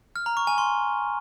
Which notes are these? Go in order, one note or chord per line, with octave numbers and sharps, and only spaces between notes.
F6
A#5
C#6
G#5
C6